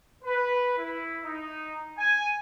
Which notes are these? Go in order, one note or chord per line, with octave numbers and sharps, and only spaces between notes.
B4
E4
D#4
G#5